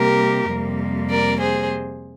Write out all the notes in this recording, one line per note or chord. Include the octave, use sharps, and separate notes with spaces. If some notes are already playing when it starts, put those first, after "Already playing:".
Already playing: C3 G3 A#3 G4 A#4
F2 C3 G3 A#3
A#4 D5
G#4 C5